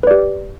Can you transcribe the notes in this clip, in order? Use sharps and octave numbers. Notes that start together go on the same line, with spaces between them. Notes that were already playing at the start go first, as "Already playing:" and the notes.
G4 B4 D5